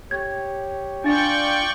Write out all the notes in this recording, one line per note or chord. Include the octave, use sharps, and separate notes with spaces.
G4 C#5 G#6
D4 F4 D5 G5 C#6 A6